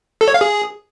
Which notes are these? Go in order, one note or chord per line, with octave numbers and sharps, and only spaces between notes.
A4
C#5
F5
G#4